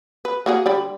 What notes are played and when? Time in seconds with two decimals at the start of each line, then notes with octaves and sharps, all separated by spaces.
0.25 B4
0.46 A#3 F#4 G#4
0.66 D3 G3 B5